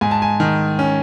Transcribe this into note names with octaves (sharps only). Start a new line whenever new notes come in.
G#2 G#5
A5
G#5
D#3
C#4